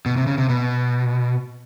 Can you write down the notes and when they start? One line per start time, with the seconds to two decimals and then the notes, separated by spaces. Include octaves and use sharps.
0.06 B2
0.17 C3
0.27 C#3
0.38 C3
0.49 B2